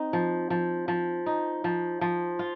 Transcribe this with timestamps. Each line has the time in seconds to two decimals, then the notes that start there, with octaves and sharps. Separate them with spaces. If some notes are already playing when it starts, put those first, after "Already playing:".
Already playing: C4 D#4
0.13 F3
0.50 F3
0.88 F3
1.26 D#4
1.64 F3
2.01 F3
2.39 F4